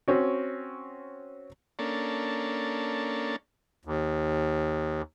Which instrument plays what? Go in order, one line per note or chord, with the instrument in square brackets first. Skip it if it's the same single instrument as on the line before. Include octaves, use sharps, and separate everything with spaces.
[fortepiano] C4 C#4 F#4
[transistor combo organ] A#3 C#4 D4 A4
[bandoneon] D#2